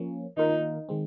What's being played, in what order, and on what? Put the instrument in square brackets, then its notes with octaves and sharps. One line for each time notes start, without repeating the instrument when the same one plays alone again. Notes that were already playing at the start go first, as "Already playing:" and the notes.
Already playing: [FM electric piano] F3 A#3 C#4
[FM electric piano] D#3 A#3 F4 A#4 [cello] D#4
[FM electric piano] D#3 G#3 C4